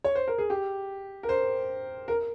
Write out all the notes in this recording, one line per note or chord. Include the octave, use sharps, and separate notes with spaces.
C#5
C5
A#4
G#4
G4
A#4
C5
A#4